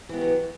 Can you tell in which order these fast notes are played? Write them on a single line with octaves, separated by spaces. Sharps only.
E3 B3 G4 F#3